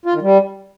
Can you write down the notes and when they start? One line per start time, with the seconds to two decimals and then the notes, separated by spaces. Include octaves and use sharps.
0.05 F4
0.14 D#3
0.22 G3